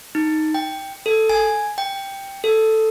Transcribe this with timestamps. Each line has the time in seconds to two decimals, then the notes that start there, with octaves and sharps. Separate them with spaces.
0.15 D#4
0.54 G5
1.06 A4
1.30 G#5
1.78 G5
2.44 A4